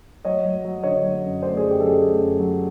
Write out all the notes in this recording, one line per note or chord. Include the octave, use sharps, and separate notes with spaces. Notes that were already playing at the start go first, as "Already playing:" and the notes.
F#3 C#5 D#5
F#3
F#3
D3 C#5 D#5
F#3
F#2
A3 C5 D5
F#2 G#4
G4
F#2 A4
G#4
A3
F#2
F#3